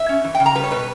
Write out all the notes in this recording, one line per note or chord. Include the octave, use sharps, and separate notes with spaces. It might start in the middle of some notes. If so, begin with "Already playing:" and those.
Already playing: E5
C#4
E3
G5
C#3
A#5
G3 B4
C#5
B2 B4